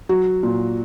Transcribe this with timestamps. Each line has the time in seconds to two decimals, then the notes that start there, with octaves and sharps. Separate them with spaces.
0.09 F#3 F#4
0.43 A#2